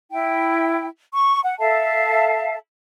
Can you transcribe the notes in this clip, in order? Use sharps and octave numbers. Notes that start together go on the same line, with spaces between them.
E4 G5
C#6
F#5
A4 E5 F5 A5